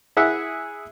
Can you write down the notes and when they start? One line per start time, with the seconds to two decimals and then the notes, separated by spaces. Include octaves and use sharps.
0.17 E4 G#4 E5 F#5